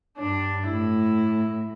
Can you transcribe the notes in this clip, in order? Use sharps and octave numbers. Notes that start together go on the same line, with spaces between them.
G2 D4
A2 E4